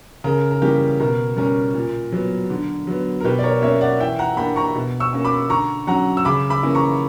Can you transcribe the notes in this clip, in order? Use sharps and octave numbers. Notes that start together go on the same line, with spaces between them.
C#3 A#4
A#4
E3 G3 A#3 C#4 G4
B2 A#4
G3 C#4 A#4
A#2
F#3 B3
D3
F#3 B3
A#4
B2 G4 B4
D5
A#4 C#5
A#3 C#4 C#5 E5
D5 F#5
E3 E5 G5
F#5 A#5
A#3 D4 G5 B5
A#5 C#6
B2
C#6 E6
A#3 C#4
B5 D6
D3 A#5 C#6
F#3 C#4 F#5 A#5
E6
C#3 B5 D6
B5 D6
E3 A#3 C#4
A#5 C#6